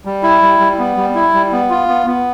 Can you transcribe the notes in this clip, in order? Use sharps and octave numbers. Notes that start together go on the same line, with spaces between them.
G3
E4
G3
G3
B3
G3
E4
G3
B3
F4
B3
B3